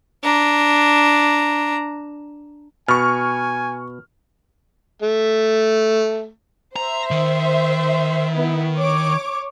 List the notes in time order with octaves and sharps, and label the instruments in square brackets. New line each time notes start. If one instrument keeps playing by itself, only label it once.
[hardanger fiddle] D4 A#5
[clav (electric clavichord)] B2 [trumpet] G#5 [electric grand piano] C#6 F6
[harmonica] A3
[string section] C5 E5 [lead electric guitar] A#5
[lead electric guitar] D#3
[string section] B3 E4
C#5 D6